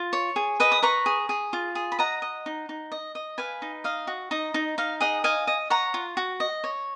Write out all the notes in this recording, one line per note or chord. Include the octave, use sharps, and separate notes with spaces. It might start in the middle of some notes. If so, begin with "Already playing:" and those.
Already playing: F4
C#5
G#4
B4 D#5
D#6
B4 A#5 C#6
G#4
G#4
F4
G#4
B5
D#5 F#5 A#5
D#5
D#4
D#4
D#5
D#5
B4 F5 G#5
D#4
D#5 F5
F#4
D#4 D#5
D#4
D#4 F5
G#4 D#5 F#5
D#5 F5 G#5
D#5
C#5 F#5 A#5
F4
F#4
D#5
C#5